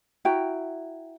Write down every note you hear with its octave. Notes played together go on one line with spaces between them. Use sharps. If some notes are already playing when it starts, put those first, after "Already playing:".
E4 F#4 G5 A#5